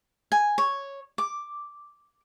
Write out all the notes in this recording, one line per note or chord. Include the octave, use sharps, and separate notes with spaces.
G#5
C#5
D6